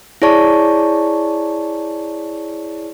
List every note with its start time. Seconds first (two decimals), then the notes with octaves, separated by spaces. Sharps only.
0.22 E4 G#4 C#5 D5 A5 C#6